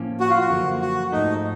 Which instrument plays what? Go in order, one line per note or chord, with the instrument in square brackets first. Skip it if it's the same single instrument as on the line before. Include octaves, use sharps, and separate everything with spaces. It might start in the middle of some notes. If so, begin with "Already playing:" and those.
Already playing: [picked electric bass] A2 F3 A#3 C#4
[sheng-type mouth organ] F#4
F4
F#4
[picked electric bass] F#2 D3 F3 A#3
[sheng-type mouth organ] F#4
[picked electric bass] G#2 F3 A3 [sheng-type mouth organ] D#4